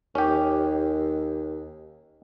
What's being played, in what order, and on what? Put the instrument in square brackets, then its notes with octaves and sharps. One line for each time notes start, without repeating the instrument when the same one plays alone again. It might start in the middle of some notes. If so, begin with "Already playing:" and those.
[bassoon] D#2 [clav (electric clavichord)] C#4 G4